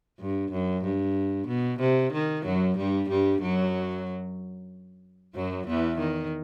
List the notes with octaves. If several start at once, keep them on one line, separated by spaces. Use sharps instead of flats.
G2
F#2
G2
B2
C3
D#3
F#2 F#3
G2 G3
G2 G3
F#2 F#3
F#2 F#3
E2 E3
D#3